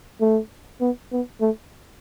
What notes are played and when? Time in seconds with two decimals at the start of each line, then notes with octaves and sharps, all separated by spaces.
0.21 A3
0.81 B3
1.12 B3
1.41 A3